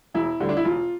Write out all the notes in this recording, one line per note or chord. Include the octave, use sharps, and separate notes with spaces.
E1 E4
D2 D3 G3
D4
E4
E1 F4